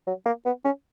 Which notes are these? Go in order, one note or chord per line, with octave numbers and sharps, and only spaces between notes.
F#3
A#3
B3
C#4